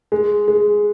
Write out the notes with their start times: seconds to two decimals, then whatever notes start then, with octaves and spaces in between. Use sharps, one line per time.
0.12 G#3
0.48 G#3